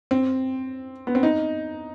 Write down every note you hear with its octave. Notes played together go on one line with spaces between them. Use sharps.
C4
B3
C4
D#4